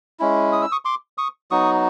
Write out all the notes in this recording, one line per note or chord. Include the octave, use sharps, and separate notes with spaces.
G#3 C#4 E4
D#6
E6
C#6 D#6
C6 D6
C#6 D#6
F#3 B3 D#4 F#4 C#6 D#6